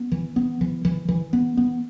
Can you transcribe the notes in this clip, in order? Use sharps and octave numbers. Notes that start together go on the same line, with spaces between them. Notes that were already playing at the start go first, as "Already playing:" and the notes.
Already playing: B3
E3
B3
E3
E3
E3
B3
B3